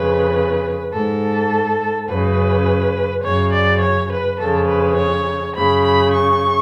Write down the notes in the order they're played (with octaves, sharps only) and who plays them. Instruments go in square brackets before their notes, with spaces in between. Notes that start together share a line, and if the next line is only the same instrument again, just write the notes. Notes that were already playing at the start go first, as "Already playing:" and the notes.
Already playing: [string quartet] F2 C#3 B4
G#2 A4
F#2 C#3 B4
F#2 C#3 C#5
D5
C#5
B4
F2 C#3 A4
B4
C#5
F#2 C#3 B5
B5
C#6